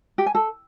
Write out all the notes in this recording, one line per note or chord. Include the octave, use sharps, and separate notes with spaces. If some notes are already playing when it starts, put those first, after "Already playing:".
G4
G#5
A4